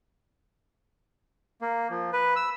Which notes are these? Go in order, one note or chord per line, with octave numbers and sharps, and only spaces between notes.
A#3
F3
B4
E6